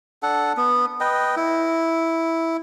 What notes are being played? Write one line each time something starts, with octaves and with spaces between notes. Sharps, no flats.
D4 A4 F#5
B3
B4 D#5 G5
E4